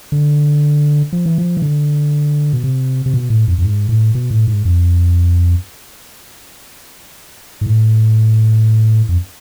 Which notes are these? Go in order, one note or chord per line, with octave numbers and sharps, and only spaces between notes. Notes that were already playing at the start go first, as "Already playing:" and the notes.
D3
F3
E3
F3
E3
D3
B2
C3
C3
B2
A2
F2
F2
G#2
A2
B2
A2
G#2
F2
G#2
A2
F2